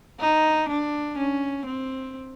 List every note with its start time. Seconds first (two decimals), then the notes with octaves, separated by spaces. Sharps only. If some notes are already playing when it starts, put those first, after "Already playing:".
0.20 D#4
0.69 D4
1.18 C#4
1.66 C4